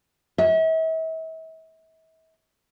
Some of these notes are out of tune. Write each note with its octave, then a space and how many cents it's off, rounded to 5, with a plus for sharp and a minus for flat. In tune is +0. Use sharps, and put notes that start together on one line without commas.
E5 -40